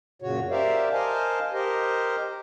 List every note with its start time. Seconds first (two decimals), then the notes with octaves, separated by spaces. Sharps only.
0.22 F#2 A#2 C#3 F#4 C#5
0.51 G4 A#4 C5 D5 E5 F5
0.93 A#4 C5 D#5 F5 G#5 A5
1.53 G4 A#4 C5 D#5